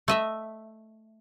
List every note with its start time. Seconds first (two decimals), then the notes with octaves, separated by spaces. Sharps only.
0.08 A3 D#5 E5